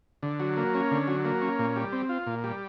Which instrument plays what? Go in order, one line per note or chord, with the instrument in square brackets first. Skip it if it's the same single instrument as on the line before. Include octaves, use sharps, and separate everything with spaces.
[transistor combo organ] D3
F#3
A#3
C#4
D3
F#3
A#3
C#4
A#2
G3
C4
F4
A#2
G3